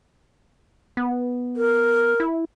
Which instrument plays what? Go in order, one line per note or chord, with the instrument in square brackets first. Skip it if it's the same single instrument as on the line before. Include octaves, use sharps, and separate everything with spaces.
[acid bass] B3
[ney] A#4
[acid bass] E4